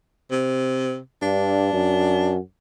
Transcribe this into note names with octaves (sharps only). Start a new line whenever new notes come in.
C3
G2 D4
F#2